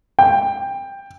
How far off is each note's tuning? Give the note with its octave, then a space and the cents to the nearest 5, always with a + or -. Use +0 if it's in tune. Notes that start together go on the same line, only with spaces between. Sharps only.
G5 +15